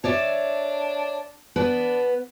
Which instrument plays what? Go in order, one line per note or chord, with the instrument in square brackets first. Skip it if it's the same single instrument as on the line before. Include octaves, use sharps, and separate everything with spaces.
[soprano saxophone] D4 [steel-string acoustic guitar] C#5 D5 E5
[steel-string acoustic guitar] B3 B4 [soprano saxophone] D4